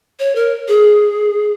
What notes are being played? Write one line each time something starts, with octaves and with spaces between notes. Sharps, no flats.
C#5
A#4
G#4